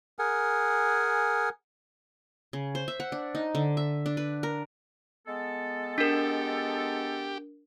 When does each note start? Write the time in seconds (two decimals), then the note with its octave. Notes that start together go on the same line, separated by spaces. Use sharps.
0.19 G#4 A#4 F#5 G#5
2.53 C#3
2.75 C5
2.88 E5
3.00 F#5
3.12 D4
3.35 D#4
3.55 D3
3.77 E5
4.06 D4
4.17 B4
4.43 A#4
5.27 G#3 B3 A4
5.98 D4 G4 A#4